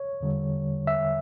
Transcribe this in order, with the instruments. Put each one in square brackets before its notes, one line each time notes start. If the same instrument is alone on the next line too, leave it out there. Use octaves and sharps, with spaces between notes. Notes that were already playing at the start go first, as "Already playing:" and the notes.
Already playing: [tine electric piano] C#5
E2 D3 G3
E5